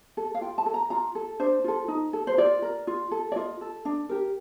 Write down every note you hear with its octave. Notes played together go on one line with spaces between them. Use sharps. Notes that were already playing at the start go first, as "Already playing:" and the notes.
A4
F5
F4 G5
A5
A4
A#5
F4 A#5
A4
D4 C5
F4 A4
D#4
A4
C5
F4 D5
A#4
F4
A4
D5
F4 D#5
A4
D4
G4 A#4